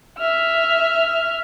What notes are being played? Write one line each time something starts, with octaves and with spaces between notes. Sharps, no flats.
E5 F6